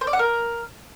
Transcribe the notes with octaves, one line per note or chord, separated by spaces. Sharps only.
C5
D5
F#5
A#4